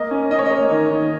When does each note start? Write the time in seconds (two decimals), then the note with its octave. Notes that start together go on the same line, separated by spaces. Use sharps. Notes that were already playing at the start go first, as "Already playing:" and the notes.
Already playing: A#3 D#5
0.11 C#4
0.31 C#4 D#5
0.39 C#5
0.46 A#3 D#5
0.70 D#3
0.90 D#3